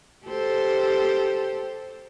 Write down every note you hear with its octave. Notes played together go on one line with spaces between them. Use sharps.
G4 A4 C5